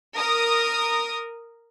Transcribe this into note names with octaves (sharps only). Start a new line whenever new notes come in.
A#4 D#6